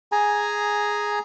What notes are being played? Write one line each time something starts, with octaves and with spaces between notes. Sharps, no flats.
G#4 G#5 A#5